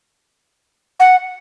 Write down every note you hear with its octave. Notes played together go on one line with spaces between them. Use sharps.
F#5